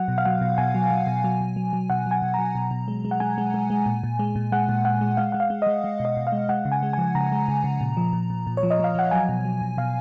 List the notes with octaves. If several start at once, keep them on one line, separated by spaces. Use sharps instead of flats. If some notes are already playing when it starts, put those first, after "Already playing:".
Already playing: F#3 F#5
B2
F5
F#3 F#5
B2
B2 G#5
F#3
F#3
B2
F#3
B2
F#3
F#3
B2 F#5
F#3 G#5
B2
F#3 A#5
B2
B2
G#3
G#3
F#5
G#3 G#5
G#3
G#3
G#3
A#2
A#2
G#3
A#2
G#3 F#5
A#2
G#3 F#5
G#3
G#3 F5
G#3 F#5
F5
G#3
G#3 D#5
G#3
B2
D#5
B2
F5
G#3
G#3 F#5
C#3
G#5
G#3
F3 G#5
C#3 A#5
G#3
C#3
C#3
A#2
F3
A#2
A#2
A#2
C#5
F3
D#5
F3 F5
F3 F#5
F#3 G#5
B2
F#3
B2
B2 F5